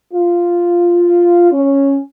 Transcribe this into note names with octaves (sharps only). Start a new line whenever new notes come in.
F4
C#4